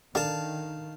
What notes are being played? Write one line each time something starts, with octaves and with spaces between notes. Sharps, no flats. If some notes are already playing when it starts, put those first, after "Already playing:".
D#3 D4 A4 A#4 F5 A5